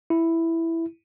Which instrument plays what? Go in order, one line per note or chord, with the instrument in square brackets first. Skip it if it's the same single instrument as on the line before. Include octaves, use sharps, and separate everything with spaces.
[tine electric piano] E4